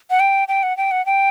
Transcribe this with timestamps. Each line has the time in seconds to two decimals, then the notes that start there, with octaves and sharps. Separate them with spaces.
0.10 F#5
0.20 G5
0.48 G5
0.63 F#5
0.77 G5
0.91 F#5
1.06 G5